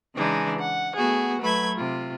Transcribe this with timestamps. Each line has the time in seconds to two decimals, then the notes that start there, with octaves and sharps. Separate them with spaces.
0.15 C#3 E3 G#3 D4 D#4
0.59 F#5
0.96 A3 B3 F#4 G#4
1.41 F#3 A3 B4 B5 G#6
1.76 C3 F4